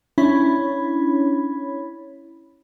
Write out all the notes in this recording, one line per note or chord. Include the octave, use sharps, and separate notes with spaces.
C#4 D4 E4 C#5 B5